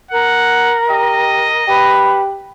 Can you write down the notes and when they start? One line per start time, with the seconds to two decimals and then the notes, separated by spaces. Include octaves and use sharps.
0.11 A#4 F#5
0.90 G4 D#5
1.68 G4 B4